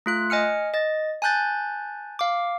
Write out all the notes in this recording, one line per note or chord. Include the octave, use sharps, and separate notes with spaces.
A3 F4 F#6
D#5 G#5 F6 C#7
D#5 A6
G#5 A5 F#6 G6 A6
F5 D6